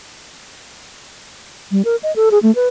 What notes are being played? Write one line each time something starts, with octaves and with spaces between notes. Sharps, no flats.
G3
A#4
D#5
A4
G#4
A3
B4